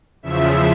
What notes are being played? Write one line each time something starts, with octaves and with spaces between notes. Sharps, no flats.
E2 C#3 F3 E5